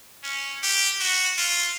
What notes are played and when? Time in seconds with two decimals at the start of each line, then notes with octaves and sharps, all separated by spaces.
0.23 C#4
0.63 G4
1.00 F#4
1.38 F4